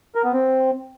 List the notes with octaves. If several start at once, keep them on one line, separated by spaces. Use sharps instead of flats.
A#4
B3
C4